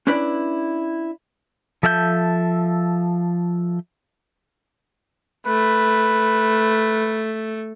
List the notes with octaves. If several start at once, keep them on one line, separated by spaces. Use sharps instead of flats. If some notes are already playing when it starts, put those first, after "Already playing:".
C#4 D4 E4 B4 D5
F3 A4 E5 F#5 G6
A3 B4